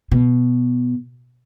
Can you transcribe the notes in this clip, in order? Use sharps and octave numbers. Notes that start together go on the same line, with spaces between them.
B2